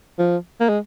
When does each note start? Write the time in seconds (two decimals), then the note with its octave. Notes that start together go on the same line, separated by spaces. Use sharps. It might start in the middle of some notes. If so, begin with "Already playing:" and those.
0.19 F3
0.60 A#3
0.69 G#3